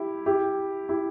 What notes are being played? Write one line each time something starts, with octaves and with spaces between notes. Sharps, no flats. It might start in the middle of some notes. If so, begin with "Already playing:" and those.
Already playing: E4 G4
E4 G4
E4 G4